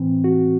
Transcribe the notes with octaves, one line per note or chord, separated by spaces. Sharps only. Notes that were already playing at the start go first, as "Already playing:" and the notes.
Already playing: A2 E3 C4
F#4